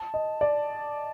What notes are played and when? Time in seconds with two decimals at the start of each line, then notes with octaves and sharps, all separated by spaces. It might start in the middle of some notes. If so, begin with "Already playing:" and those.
Already playing: A5
0.14 D#5
0.41 D5